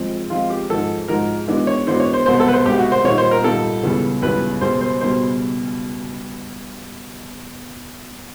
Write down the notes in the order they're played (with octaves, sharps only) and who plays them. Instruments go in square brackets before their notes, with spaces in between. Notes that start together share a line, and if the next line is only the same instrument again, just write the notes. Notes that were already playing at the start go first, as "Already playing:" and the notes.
Already playing: [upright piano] F3 G#3 C4
[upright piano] F3 G#3 C4 [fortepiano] F4
[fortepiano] G4
[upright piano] G#2 F3 G#3 [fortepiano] A4
[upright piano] G#2 F3 G#3 [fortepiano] A#4
[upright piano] E3 G#3 B3 D4 F#4
[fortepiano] C#5
[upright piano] E3 G#3 B3 D4 F#4 [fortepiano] C5
[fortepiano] C#5
C5
[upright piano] C2 B2 G#3 B3 [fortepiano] C5
[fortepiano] A4
B4
C5
[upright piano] C2 B2 G#3 B3 [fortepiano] G4
[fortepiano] F#4
C5
[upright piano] A#2 G3 A#3 D#4 [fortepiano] C#5
[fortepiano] C5
A#4
[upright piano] A#2 G3 A#3 D#4 [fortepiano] A4
[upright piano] C#2 C#3 E3 G3 B3
[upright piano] C#2 C#3 E3 G3 B3 [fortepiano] B4
[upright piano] C#2 B2 G3 [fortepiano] C5
[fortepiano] C5
[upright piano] B2 G3 [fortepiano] C5